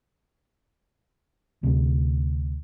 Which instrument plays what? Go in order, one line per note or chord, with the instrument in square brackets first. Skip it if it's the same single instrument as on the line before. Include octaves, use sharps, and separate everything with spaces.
[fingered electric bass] D2 C3